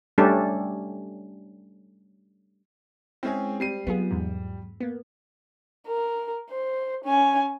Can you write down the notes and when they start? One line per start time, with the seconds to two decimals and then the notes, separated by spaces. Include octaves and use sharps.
0.18 G3 A3 C#4 D4 G4 A4
3.23 G#3 C4 C#4 E4 G#4
3.60 G3 C4 C7 D#7
3.87 F#3 B3 F4 G#4
4.11 E2 G#2
4.80 A#3 B3
5.87 A#4
6.50 C5
7.05 C#4 G#5